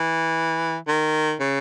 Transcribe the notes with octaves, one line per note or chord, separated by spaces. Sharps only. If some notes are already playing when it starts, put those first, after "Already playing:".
Already playing: E3
D#3
C#3